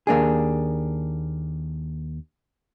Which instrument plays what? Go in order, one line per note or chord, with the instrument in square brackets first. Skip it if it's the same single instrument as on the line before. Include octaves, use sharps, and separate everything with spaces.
[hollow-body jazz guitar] D#2 A#3 D4 G#4